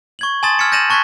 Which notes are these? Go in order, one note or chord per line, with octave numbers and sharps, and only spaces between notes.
C#6 G#6 F#7
G#5 A5 C6 D#6 A6 E7
E6 F6 G#6 B6 C#7 E7
G6 A6 A#6 D#7 E7 F#7
A5 C#6 F#6 G#6 A6 B6